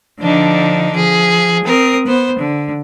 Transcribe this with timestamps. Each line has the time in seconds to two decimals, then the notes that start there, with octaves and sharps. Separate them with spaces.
0.20 D3 F3 D4 D#4
0.92 F3 G#4
1.64 C4 A#4 D#6
2.05 B3 C5
2.39 D3